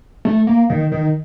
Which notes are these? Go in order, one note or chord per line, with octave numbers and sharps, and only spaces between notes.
A3
A#3
D#3
D#3